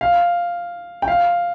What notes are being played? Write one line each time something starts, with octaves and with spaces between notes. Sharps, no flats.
F5
G5
F5